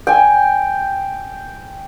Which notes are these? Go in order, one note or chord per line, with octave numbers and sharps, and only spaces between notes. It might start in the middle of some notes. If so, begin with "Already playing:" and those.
G5 G#5